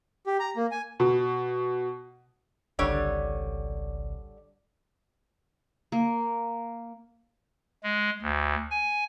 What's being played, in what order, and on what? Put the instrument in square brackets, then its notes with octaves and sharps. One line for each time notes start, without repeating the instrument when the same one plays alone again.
[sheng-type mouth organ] G4
A#5
A#3
G#5
[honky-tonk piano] B2
[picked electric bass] G#1 C#2 [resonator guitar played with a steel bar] D3 G3 C#5
[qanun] A#3
[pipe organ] G#3
D2
G#5